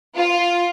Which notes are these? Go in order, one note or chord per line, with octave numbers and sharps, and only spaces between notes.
F4